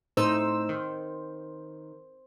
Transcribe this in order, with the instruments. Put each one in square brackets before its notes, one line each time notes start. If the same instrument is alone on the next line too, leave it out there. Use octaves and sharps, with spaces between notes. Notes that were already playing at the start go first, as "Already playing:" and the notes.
[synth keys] A2 D#4 E6 [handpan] C5
[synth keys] D#3